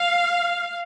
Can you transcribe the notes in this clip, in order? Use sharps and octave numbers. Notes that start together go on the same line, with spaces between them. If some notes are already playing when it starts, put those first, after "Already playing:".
Already playing: F5